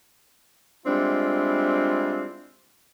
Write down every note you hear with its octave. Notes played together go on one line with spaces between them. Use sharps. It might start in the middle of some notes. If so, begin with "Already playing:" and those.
G3 G#3 C4 D4 E4 F4